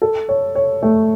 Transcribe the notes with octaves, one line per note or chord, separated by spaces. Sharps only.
A4
C#5
C#5
A3